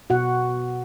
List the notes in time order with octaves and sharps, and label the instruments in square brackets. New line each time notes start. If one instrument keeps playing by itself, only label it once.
[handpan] B2 F#4 F#5